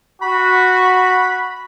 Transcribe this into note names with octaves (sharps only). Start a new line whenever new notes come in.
F#4 B5